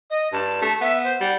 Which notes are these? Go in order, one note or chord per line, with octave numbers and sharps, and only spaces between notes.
D#5
G2 A5
A3
B3 E5
C5
G3 F#5